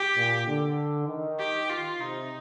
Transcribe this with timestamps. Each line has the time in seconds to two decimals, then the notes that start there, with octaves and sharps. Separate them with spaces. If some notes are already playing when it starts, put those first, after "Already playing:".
Already playing: G4
0.16 A#2
0.47 D3
1.08 D#3
1.39 G4
1.70 F4
2.01 C3 D#4